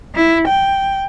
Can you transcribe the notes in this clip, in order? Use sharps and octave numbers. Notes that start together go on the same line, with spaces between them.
E4
G5